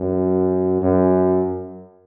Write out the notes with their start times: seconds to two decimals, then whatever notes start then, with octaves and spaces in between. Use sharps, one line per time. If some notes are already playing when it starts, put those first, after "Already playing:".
Already playing: F#2
0.82 F#2